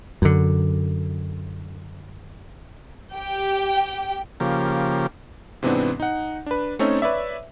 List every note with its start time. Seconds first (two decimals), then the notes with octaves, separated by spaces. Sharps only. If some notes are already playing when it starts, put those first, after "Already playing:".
0.22 F#2 D3
3.14 G4 G5
4.40 C#3 F3 A#3 G4
5.63 G#2 C3 E3 B3 C4 D4
6.00 D#4 F#5
6.46 D4 B4
6.79 A3 C4 C#4 D#4 A4 C#5
7.02 B4 C#5 D5 E5